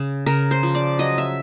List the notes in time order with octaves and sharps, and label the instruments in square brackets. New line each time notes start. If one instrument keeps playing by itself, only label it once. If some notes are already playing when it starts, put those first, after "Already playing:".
Already playing: [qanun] C#3
C#3 A#4
C5
F3
D5
F#3 D#5
E5